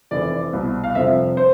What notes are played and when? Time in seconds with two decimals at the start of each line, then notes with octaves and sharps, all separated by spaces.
0.11 F1 F2 E3 D5
0.53 C2 B2
0.84 F5
0.95 G1 F2 C3 F3 E5
1.37 C5